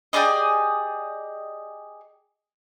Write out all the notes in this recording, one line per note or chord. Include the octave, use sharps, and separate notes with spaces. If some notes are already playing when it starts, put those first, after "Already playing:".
G4 G#4 D5 D#5